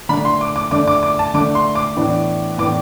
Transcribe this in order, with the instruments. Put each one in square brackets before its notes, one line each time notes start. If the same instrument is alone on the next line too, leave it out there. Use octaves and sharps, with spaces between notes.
[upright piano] D3 A3 D4 B5
C6
D6
D6
D3 A3 D4 D6
D6
D6
A5
D3 A3 D4 D6
C6
D6
A2 E3 B3 D4
A2 E3 B3 D4 D6